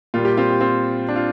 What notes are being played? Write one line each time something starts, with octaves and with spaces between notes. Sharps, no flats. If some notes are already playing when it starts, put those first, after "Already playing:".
A#2 G3 F4
G4
C4 F4
G4
C4 F4
D4
F4